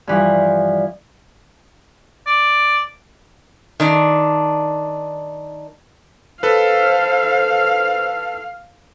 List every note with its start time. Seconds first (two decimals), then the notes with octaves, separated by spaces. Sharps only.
0.07 G2 E3 F3
2.27 D5
3.80 D#3 D4
6.43 A4 B4 C5 F5